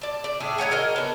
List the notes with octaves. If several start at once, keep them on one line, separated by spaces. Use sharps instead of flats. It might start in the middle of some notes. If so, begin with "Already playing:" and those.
D5 A5
D5
A2 A3 D4 G#4
D#4 C#5 F#5 G#5
F#4 A#4 D#5
B3 D4